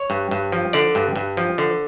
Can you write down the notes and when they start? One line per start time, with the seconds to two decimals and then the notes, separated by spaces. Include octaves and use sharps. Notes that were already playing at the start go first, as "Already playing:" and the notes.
Already playing: C#5
0.10 G2
0.31 G2
0.52 F3
0.73 D3 D5
0.95 G2
1.16 G2
1.37 F3
1.58 D3